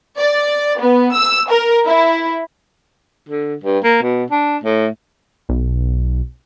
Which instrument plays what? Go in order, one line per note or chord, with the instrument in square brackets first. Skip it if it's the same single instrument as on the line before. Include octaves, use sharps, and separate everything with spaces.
[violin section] D5
B3
E6
A#4
E4
[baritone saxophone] D3
G2
A#3
B2
D4
A2
[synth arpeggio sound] B1